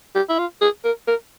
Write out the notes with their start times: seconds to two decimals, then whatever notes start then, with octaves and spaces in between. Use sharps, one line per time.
0.15 G4
0.29 E4
0.39 F4
0.62 G#4
0.84 A#4
1.07 A#4